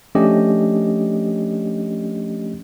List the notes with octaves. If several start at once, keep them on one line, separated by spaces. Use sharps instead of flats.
F3 A3 C#4 D4 G4 D#5